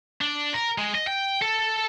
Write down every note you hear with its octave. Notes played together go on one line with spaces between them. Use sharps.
D4
A#4
G#3
D#5
G5
A4